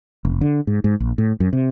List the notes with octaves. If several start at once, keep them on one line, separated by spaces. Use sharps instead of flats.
F1
D3
G#2
G#2
A#1
A2
F#2
C3